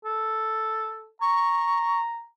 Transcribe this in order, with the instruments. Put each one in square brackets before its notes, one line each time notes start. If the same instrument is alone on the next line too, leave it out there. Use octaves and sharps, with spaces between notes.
[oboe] A4
[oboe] A#5 [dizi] C#6